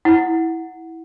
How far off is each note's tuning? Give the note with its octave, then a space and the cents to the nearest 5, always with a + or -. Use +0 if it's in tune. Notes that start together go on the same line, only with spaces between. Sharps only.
E4 -15 F#5 +0